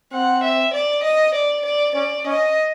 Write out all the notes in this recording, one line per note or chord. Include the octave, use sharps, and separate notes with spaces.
C4 F#5
E5
D5
D#5
D5
D5
C#4 D5
C#4 D#5